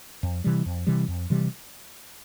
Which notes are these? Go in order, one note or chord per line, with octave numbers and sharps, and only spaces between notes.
F2
C3 E3 G3
F2
C3 E3 G3
F2
C3 E3 G3